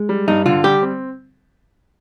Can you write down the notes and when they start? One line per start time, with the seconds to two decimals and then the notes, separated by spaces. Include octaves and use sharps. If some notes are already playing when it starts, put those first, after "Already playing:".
Already playing: G#3
0.09 G3
0.28 G2 D#4
0.46 D3 F4
0.64 G3 G4
0.82 C4